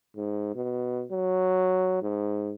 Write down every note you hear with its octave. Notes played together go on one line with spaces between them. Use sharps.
G#2
B2
F#3
G#2